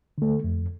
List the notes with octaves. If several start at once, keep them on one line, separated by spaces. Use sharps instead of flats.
D3 A3
F2